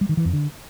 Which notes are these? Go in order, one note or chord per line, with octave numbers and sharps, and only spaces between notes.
G3
D#3
E3
F2
D3